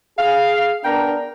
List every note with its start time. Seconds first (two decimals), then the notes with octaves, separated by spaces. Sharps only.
0.19 G#4 F5
0.85 B3 D4 A#4 G5 A#5